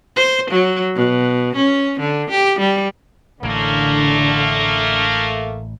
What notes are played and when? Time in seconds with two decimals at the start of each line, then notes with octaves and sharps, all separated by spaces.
0.16 C5
0.51 F#3
0.95 B2
1.56 C#4
2.00 D3
2.30 G4
2.60 G3
3.43 A1 A2 D3 A3 A#3